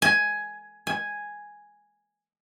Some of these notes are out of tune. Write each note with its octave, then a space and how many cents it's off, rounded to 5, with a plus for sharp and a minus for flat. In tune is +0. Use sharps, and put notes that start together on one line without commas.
G#5 +10
G#5 +0